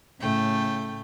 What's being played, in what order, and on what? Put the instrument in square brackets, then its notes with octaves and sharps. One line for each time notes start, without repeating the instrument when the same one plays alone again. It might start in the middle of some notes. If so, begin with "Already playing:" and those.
[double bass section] A2 [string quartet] C#3 A3 G5